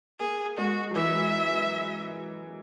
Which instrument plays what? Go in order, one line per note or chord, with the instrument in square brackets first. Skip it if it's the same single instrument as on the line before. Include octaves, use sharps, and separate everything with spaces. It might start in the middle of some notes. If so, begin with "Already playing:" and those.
[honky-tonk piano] A#3 [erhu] G#4
[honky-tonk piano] G#3 [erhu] F#4
[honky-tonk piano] F#3
[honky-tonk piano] E3 [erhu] E5